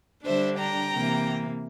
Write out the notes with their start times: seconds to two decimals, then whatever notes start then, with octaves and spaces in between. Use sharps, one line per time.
0.24 D3 G3 D4 C5 E5
0.58 G5 A#5
0.92 C3 E3 A#3